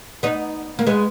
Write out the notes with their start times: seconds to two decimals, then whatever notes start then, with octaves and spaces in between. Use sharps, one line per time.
0.23 B3 D#4
0.79 A#3
0.87 G#3 B3